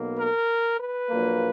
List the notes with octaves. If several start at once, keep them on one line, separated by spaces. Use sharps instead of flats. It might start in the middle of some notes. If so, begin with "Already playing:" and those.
Already playing: B1 B2 A#3
A#4
B4
A#1 A#2 F#3 A#3